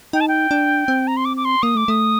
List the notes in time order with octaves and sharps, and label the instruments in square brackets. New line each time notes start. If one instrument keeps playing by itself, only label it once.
[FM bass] D#4 [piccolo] G5
[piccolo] A5
G5
[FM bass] D4
C4
[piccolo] A#5
C6
D6
D6
C6
[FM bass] A#3 [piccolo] D#6
[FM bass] A3 [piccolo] D6
[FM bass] A3 [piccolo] D#6